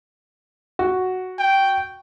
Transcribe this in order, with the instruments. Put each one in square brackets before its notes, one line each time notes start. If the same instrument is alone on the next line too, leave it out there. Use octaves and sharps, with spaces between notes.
[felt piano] F#4
[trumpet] G5